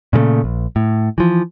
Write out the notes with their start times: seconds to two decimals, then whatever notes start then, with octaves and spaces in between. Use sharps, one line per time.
0.13 A#2 C#3 G#3 A3
0.44 A#1
0.76 A2
1.18 E3 F3